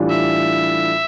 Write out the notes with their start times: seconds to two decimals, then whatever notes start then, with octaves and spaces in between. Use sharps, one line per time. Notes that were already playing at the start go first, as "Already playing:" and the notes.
Already playing: A2 E3 G3 D4 F4
0.10 E5